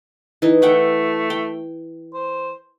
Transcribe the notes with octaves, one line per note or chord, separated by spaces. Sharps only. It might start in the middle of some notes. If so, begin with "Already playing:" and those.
E3 D#4
A3 E5 F#5 G5
G5
C5